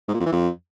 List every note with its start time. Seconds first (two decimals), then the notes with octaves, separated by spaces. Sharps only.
0.08 G#2
0.14 A#2
0.20 F2
0.26 E3
0.32 F2